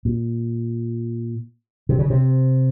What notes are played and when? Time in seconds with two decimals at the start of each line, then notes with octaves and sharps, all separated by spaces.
0.05 A#2
1.89 C3
1.99 C#3
2.10 C3